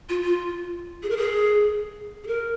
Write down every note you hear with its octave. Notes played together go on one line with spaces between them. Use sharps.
F4
F4
G#4
A#4
G#4
G#4
A#4